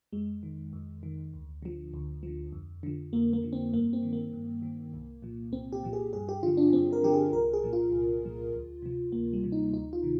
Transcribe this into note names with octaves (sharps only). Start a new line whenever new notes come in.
F2 G#3
D#3
F2
D#3
D2
D3 F3
D2
D3 F3
F2
D3 F3
F2 A#3
A#3
D3 F3
C4
G2 A#3
C4
D#3
A#3
G2
D#3
C2
A#2 F3
C2 C4
G4
A#2 F3
G#4
G2 G#4
G4
D3 F3 F4
D4
G2 C4
A#4
D3 F3 G4
G#4
C2 A#4
G#4
A#2 F3
F4
C2
A#2 F3
D2
C3 F3
D2 A#3
G3
C3 F3
D#4
D2 D#4
F4
C3 D#3